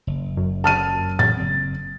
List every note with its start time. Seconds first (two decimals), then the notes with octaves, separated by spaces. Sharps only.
0.07 F#1
0.37 F#2
0.64 A5 F6 D#7
1.19 A2 E3 A6
1.37 F#1 C4